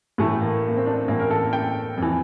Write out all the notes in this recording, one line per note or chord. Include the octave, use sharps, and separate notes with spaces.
A2 E3 A3
A#3
A#3
C4
D4
A2 E3 A#3
A#4
A4
G5
F2 E3